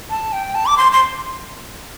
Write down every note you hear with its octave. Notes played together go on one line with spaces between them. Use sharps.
A5
G5
A5
D6
C6
C6